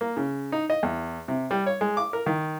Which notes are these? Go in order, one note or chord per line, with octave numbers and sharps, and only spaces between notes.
A#3
C#3
D#4
D#5
E2
C3
G3
C#5
G#3
D6
A#4
D#3